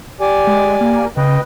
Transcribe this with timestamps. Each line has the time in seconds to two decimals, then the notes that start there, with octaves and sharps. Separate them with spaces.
0.20 G4 D5 G#5
0.47 G#3
0.81 A#3
1.17 C#3 B4 D#5 G5